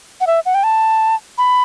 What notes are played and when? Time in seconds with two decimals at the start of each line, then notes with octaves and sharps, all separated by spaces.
0.21 F#5
0.27 E5
0.46 F#5
0.55 G5
0.64 A5
1.38 B5